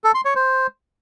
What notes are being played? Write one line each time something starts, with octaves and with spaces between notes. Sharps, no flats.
A4
C6
C#5
C5